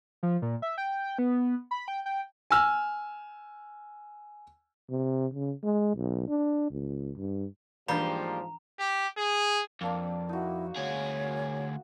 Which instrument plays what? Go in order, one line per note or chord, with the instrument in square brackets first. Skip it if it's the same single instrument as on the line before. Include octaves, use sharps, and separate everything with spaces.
[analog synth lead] F3
A#2
E5
G5
B3
B5
G5
G5
[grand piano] G#5 E6 F6
[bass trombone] C3
C#3
G#3
B1
D4
C#2
G2
[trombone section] G#2 F3 [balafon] E3 D4 [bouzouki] G3 A#3 G5 [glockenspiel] A#5
[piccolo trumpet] G4
G#4
[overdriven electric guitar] F2 [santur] A#3 D4 F5
[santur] D#4 F#4 [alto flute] E4
[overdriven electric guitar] D2 G#4 [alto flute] C#5